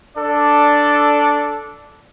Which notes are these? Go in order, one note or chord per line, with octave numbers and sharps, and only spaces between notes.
D4 A4 D5